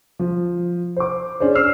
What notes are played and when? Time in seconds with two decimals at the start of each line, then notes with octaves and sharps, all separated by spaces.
0.19 F3
0.97 C5 D6
1.40 C#4 D4 G#4 C5
1.55 E6 F6 C7